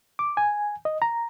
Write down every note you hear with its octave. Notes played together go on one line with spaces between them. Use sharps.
D6
G#5
D#5
A#5